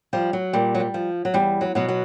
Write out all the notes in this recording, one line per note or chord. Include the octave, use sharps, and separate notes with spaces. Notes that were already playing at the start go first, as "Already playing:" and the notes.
F3 G3
F#3
A#2 G3
F#3
G3
F3
F#3
E2 G3
F#3
B2 F#3
F#3